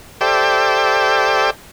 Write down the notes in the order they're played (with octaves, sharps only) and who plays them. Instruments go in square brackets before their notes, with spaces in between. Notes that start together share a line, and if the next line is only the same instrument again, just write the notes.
[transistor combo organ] G4 A4 C5 D5 E5 G5